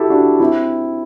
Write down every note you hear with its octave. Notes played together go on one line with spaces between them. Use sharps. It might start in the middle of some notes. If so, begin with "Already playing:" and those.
Already playing: E4 F#4 G4 A4
D4 F#4
C4 E4